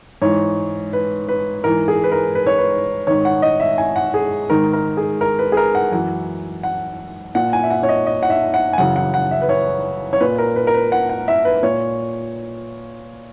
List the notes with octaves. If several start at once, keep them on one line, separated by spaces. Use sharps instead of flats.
G#2 E3 C#5
B4
B4
G#2 E3 A#4
G#4
B4
A#4
B4
C#5
B4
G#2 D#3 C#5
F#5
D#5
E5
G#5
F#5
G#4
G#2 D#3 A#4
A#4
G#4
A#4
B4
G#4
A#4
F#5
F#2 E3 F#5
F#5
A#2 F#5
G#5
E5
F#5
C#5
D#5
D#5
F#5
E5
F#5
G#5
F#2 C#3 E3 F#5
F#5
F#5
E5
B4
C#5
C#5
A#2 B4
A#4
B4
A#4
B4
F#5
F#5
E5
B4
A#2 C#5